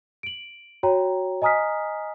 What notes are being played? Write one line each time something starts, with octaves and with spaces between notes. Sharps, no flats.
D7 F#7
F#4 C#5 G5 A#5
D#5 G#5 A#5 D#6 F6 B6